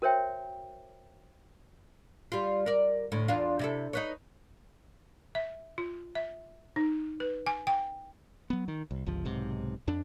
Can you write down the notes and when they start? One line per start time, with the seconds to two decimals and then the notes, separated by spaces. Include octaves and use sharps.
0.02 F#4 A#4 C5 C#5 E5 G5
2.32 G3 F4
2.66 A#4 D5
3.12 D2 A2
3.28 E2 D4 F4
3.59 C3 E4 A4
3.93 D#4 B4 C#5
5.35 E5
5.78 F4
6.15 E5
6.76 D#4
7.20 B4
7.46 G#5
7.67 G5
8.50 F#3 B3
8.68 D#3
8.91 C2
9.06 G1 C#2 F3
9.25 B1 G#2 C3
9.88 F2 D4